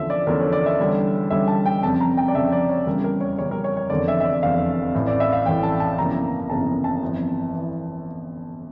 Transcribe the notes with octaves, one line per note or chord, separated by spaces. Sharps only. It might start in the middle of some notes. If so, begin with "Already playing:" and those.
Already playing: E2 D3 F3 A3 C#4 E5
D5
E2 D3 F3 A3 C#4 A#4
C#5
D5
E5
E2 D3 G3 C#4
E2 D3 G3 C#4 E5
A5
G5
F1 F2 C#3 A5
A#5
G5
D5
F1 F2 C#3 E5
D5
C#5
E2 C#3 G3 C#4 A#4
A#4
C#5
E2 C#3 G3 C#4 C#5
A#4
C#5
C#5
F1 E2 D3 D5
E5
E5
D5
F1 E2 D3 F5
A1 A2 E3
D5
E5
F5
A1 A2 E3 G5
A5
A5
G1 F2 C#3 E3 A#3 A#5
G1 F2 C#3 E3 A#3 A5
A5
G1 F2 E3
E3